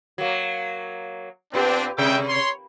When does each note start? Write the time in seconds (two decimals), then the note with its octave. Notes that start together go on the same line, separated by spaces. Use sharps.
0.18 F#3 A#3
1.54 A#2 B3 C4 D4 G4
1.98 C3 G#3 E5 G5
2.29 C#5 C6